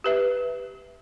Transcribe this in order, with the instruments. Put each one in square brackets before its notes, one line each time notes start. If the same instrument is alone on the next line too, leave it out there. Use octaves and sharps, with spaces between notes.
[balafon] G4 B4 E5